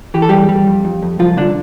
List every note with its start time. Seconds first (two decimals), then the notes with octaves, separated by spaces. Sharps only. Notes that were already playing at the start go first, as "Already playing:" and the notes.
0.14 E3 G4
0.22 A4
0.29 E2 G3 G4
0.49 G3
0.67 F2
0.85 F2
1.03 F2
1.19 C2 F3 F4
1.37 C2 D3 D4